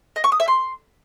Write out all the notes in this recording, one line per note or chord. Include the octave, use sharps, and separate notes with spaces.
D#5
C#6
D#6
E5
C6